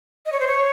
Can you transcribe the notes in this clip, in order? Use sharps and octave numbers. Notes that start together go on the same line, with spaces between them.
D#5
C#5
C5
C#5